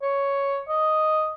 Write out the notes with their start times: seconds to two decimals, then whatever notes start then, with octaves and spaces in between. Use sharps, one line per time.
0.02 C#5
0.68 D#5